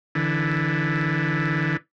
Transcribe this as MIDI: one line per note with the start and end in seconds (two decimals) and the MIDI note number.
0.15 1.77 50
0.15 1.77 52